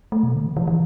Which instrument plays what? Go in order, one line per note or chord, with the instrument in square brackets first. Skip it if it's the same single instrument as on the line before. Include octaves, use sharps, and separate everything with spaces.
[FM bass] A3
B2
D3
E3
E3
E3